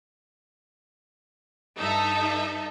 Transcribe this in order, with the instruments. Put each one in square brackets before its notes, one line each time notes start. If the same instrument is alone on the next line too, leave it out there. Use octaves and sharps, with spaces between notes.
[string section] G2 D#4 A4 E5